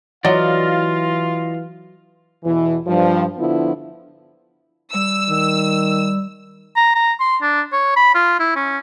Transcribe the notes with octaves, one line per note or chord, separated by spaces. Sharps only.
E3 F#3 F4 D5 D#5 F5
E2 B2 E3
G2 F3
D3 F3 B3 E4 F4
G3 E6
D#3
A#5
A#5
C6
D4
C#5
B5
F4
E4
C#4